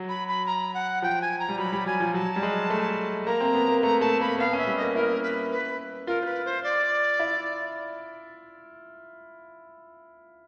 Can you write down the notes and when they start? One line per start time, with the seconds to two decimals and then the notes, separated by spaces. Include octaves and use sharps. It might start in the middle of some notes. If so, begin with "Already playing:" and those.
Already playing: F#3
0.09 B5
0.28 B5
0.46 A#5
0.74 F#5
1.02 F3 G5
1.22 G#5
1.39 A#5
1.49 G3
1.58 F#3 B5
1.73 G3
1.86 F#3 G#5
2.00 F3
2.14 F#3 A5
2.36 G3
2.43 G#3
2.70 A3
3.26 A#3 A#5
3.40 C4
3.55 B3
3.69 A#3
3.82 A3 A#5
4.01 A3 A5
4.20 A#3 B5
4.39 B3 F5
4.53 C#4
4.58 E5
4.67 G3
4.77 A#3 D#5
4.95 E4 A#4
5.23 B4
5.52 B4
6.07 F4 A#4
6.22 C5
6.25 B4
6.45 C5
6.64 D5
7.20 E4